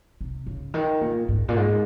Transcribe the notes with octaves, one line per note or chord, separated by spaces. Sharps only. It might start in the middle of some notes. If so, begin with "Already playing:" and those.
C3
C#3
D#3
A#2
G#2
A#2
G#2